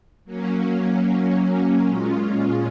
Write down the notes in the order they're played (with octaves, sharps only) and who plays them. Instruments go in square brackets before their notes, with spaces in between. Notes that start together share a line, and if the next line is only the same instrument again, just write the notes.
[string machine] F#3 A#3 C#4
A#2 G#3 C#4 F4